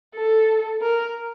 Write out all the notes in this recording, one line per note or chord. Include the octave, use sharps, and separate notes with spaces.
A4
A#4